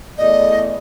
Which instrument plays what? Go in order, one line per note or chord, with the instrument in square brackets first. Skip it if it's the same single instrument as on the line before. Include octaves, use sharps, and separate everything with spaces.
[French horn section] E2 A3 D5 [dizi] D#5